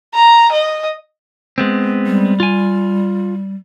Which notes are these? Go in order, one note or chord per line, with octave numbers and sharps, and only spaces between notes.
A#5
D#5
G#3 B3 C4
G3
F4 G#5